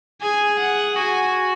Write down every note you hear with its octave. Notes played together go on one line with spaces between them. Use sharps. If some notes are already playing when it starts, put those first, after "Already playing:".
G#4 G#5
F#5
F#4 G#5